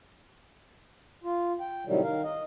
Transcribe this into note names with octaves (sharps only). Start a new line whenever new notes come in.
F4
G5
A2 C3 D#3 F#3 G3
D#3 A#4 F5
D#5